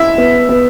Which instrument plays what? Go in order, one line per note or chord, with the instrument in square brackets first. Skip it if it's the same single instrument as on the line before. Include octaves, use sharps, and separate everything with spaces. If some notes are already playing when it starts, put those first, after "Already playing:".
Already playing: [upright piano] E4 [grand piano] E5
[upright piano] B3
B3